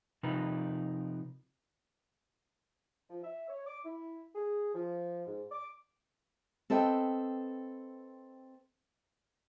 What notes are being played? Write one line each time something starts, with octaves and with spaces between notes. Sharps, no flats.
C3 F3 D#4 A#4 B4
F3
E5
C#5
D6
E4
G#4
F3
G#2
D6
C4 A4 B4 D#5 G5